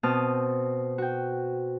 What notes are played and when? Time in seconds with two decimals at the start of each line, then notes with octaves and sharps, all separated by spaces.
0.03 B2 C4 A5 D#6 F6
0.98 F#4 G5